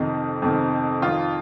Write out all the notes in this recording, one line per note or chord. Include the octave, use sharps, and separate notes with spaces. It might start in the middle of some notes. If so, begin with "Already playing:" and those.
Already playing: F2 C3 D#3 D#4
F2 C3 D#3
F2 D#3 F4